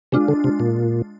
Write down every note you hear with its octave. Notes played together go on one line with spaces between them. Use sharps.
C3 G#3 D4 F4
D3
C3
A#2